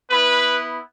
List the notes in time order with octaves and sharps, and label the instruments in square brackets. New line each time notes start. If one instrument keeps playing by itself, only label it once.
[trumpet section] B3 E4 B4